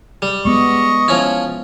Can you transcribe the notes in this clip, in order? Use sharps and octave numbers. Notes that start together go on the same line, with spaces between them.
G3
G#3 B3 D#5 C#6
F3 C#4 E4